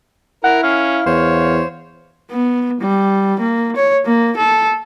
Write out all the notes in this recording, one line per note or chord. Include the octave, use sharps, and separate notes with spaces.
E4 A#4 F#5
C#4 F5
E2 C5 C#5
B3
G3
A#3
C#5
A#3
A4